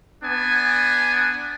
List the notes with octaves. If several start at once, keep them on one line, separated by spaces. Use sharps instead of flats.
B3 D4 G#5